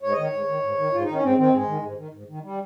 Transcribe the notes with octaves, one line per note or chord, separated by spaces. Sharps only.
G#2 C#5
D#5
D#3 C#5
G#2
D#3
G#2
D#3
G#2 F4
D#4
D#3 C#4
G#2 C4
D#3 C4
G#2 G#3
D#3
G#2
D#3
G#2
D#3
G3